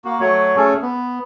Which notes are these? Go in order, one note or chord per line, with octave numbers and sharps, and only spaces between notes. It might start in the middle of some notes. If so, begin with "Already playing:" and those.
A#3 F#4
F#3 A3 F#4 C#5
A3 C#4 G#4 A4
B3